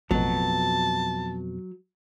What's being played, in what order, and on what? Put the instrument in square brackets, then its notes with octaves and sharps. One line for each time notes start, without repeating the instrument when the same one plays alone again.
[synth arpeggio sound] A1 [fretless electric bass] F2 B2 [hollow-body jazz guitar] F#3 [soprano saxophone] A5